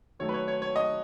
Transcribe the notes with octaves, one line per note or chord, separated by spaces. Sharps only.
D#3 F#3 A3 C#5
B4
C#5
C#5
C#5
D#5